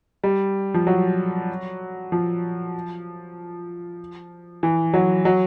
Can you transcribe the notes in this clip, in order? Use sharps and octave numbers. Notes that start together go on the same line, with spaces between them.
G3
F3
F#3
F3
E3
F#3
F#3